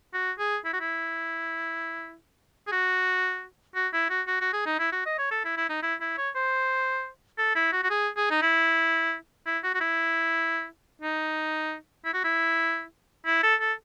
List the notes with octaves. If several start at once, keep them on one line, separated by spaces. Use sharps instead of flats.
F#4
G#4
E4
F#4
E4
G#4
F#4
F#4
E4
F#4
F#4
F#4
G#4
D#4
E4
F#4
D#5
C#5
A4
E4
E4
D#4
E4
E4
C#5
C5
A4
E4
F#4
F#4
G#4
G#4
D#4
E4
E4
F#4
F#4
E4
D#4
E4
F#4
E4
E4
A4
A4